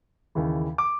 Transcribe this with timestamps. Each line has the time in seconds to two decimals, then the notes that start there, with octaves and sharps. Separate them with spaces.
0.35 D#2 C#3 E3
0.78 D6